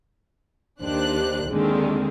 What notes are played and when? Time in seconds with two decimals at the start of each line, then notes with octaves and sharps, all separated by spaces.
0.82 D#2 D#3 D4 G4 C5 F#6
1.50 D#2 D3 D#3 G#3 C4